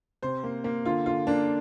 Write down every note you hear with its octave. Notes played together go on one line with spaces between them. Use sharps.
C3 C5
A#3
A#3
D3 F4
D3 F4
A#3 D4